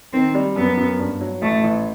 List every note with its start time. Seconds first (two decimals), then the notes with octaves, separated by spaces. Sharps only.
0.13 D#3 C4
0.35 G3
0.56 F#2 B3
0.77 F#2
0.99 G2
1.21 F#3
1.42 A1 A3
1.64 A1